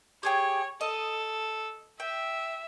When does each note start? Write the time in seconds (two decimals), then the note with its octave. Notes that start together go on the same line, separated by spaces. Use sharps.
0.23 G4 G#4 C#5 G5
0.81 A4 D#5
2.00 E5 G5